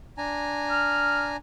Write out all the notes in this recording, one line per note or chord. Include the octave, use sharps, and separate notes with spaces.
D4 G#5 A#5
F6